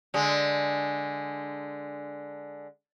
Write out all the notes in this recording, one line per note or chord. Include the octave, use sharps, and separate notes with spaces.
D3 G#3